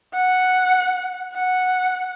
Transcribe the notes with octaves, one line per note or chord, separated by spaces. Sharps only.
F#5
F#5